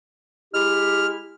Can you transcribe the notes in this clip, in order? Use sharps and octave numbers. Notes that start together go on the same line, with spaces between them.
G#3 E4 G4 F6